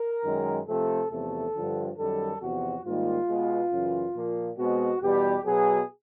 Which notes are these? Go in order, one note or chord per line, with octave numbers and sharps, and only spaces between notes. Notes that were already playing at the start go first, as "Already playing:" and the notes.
Already playing: A#4
F#2 D#3 G#3
C3 F3 A3 C4 A4
E2 C3 F3 A3 A4
G2 D3 F3
F#2 D#3 G3 A4
E2 C3 F3 F#4
G#2 D#3 G3 A#3 F4
B2 G#3 B3
F#2 C#3 E3
A#2 F3 A#3
B2 G#3 C4 F#4
E2 B2 G3 G4
B2 F#3 B3 G#4